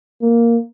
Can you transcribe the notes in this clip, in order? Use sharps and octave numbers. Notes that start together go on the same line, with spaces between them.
A#3